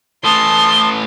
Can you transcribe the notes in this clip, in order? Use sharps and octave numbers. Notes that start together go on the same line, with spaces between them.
A2 E3 A5 C6 D#6